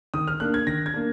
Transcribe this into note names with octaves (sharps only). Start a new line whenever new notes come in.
D#3 D#6
F6
A#3 D4 F#6
G#6
D#3 A#6
G#6
A#3 D4